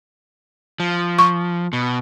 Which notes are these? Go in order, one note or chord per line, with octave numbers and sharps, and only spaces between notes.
F3
C#6
B2